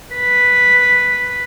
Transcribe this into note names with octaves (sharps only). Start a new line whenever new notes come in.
B4